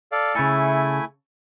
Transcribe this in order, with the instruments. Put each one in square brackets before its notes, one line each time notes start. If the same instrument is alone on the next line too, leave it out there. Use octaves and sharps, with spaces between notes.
[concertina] A4 D5 F5
[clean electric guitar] C#3 A4 [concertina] A3 E4 G#5